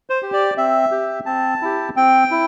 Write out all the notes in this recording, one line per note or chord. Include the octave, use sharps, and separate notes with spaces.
C5
G4
D5
C4 E5
G4
C4 A5
E4 G4
C4 G5
E4